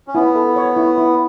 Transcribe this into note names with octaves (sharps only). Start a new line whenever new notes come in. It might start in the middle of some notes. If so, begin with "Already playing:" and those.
C#4
B3 E4
A4
C#5
E4
E4